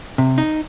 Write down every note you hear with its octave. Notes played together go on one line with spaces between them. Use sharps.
C3
D#4